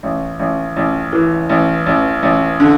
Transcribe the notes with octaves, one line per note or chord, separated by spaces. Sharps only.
A1
A1
A1
E3
A1
A1
A1
D3